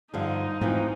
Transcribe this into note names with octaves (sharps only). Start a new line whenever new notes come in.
G2 D3 F3 D#4
G#2 E3 F3 A3 C4